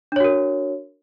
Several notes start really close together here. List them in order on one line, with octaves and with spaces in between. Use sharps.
D4 C#5 F#4 A#4